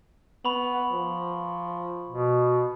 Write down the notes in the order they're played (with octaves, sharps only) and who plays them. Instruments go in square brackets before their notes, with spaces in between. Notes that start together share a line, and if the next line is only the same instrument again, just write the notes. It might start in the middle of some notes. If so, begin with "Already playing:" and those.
[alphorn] B3 [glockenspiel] B5 C#6 F#7
[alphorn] F3
[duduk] B2